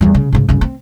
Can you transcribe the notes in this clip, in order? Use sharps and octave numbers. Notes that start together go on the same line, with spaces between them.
E2 G3
C#3
G#2 C#3
G2 C#3
C4